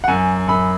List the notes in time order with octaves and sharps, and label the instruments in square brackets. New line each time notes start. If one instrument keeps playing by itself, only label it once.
[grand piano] F#5
F#2 G#5
F#2 B5